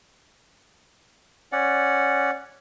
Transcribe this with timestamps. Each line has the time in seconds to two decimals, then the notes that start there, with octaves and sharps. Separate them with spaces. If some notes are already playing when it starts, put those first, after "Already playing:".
1.52 C#4 D5 F#5